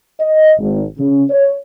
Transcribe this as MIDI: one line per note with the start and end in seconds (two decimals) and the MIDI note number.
0.20 0.53 75
0.59 0.83 32
0.99 1.23 49
1.30 1.54 73